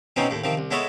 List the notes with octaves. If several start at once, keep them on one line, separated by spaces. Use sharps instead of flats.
B2 E3 F#3 C4 C#4 D#4
D#2 A2
C3 D#3 F3
C2
G#3 B3 E4 A4 C#5 D#5